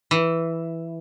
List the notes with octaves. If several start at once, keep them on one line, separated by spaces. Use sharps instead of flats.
E3